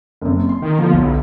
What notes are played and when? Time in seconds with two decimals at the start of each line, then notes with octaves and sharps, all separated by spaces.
0.21 F#1 C3
0.49 C6
0.62 D#3
0.79 D3 F3 B3
0.94 B1